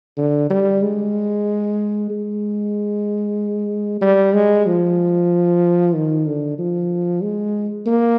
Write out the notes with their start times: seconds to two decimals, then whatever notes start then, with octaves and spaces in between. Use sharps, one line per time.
0.17 D3
0.50 G3
0.82 G#3
2.10 G#3
4.02 G3
4.35 G#3
4.67 F3
5.95 D#3
6.27 D3
6.58 F3
7.23 G#3
7.87 A#3